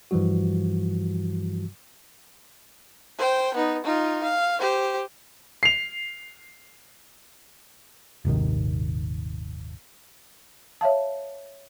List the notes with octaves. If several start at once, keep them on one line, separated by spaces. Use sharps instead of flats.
G2 E3 F3 G3 F#4
C5 G5
B3 D#4
D#4 F4
F5
G4 C5
C7 F7
D#1 G#1 C3 D#3
C#5 E5 F5 A5